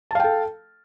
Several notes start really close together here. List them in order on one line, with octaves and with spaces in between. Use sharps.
A5 F5 G5 A4